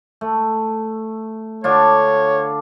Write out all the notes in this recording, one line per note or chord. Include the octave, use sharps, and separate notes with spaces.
A3
D3 D4 F4 C#5